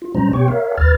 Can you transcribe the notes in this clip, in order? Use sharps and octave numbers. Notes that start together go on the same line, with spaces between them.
F4
A#2 F#3 G3 C#4 C5 A#5
B2 B3 G4 C#5 G5 C#6
A#4 C#5 E5 F5
D#2 B4 F6 A6